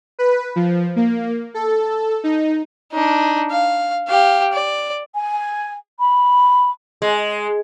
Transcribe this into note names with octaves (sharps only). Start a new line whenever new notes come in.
B4
F3
A#3
A4
D#4
D4 D#4
F5
G4 F5
D5
G#5
B5
G#3